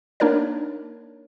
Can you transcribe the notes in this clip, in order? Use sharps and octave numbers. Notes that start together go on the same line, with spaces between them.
A#3 D4 D#4 A#4 C#5 D5